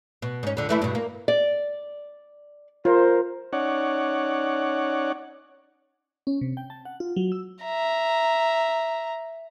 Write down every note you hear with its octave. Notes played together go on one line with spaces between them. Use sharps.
B2
G#2 C#4
F2 D3
E3 A3 E4
G2 B2
A#3
D5
F4 A#4 C5
C#4 D#4 C#5 D5 F#5
C#4
C3
G5
A5
F#5
F4
F#3
E6
E5 A#5